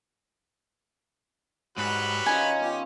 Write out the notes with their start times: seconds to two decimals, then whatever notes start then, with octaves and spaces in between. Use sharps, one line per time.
1.77 G#2 F#3 G3 B4
2.26 D#3 C#4 D#4 F4 G#5
2.61 B3 F4 G4